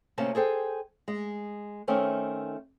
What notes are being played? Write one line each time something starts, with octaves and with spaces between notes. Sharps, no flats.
D2 C3 A#3 C#4 A5
G#4 A4 C5 G5
G#3
D#3 A3 C4 C#4 D#4